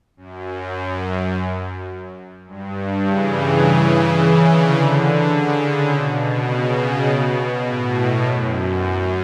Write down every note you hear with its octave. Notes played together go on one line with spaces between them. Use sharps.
F#2
G2
C#3 E3
C#3 E3
D3
C#3
C#3
B2
C#3
B2
A2
F#2